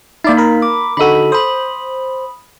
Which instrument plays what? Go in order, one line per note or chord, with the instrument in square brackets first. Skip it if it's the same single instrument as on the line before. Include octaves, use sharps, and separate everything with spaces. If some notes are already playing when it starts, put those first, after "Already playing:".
[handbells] A#3 D#4 [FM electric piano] E4 D5
[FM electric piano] A#4 B5
[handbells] D6
[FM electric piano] D3 D#4 F#4 [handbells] A4 B5
[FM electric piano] C5 [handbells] B5 D#6